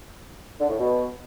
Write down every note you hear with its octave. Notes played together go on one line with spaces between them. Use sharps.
D3
A2
B2